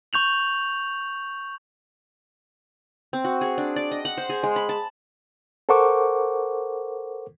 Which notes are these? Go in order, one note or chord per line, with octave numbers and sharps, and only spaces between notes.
C#6 G6 F7 F#7
C4
F#4
G#4
D4
D5
D#5
F#5
C5
G#4
G#3
B5
A5
A4 A#4 C5 F#5 C#6 D6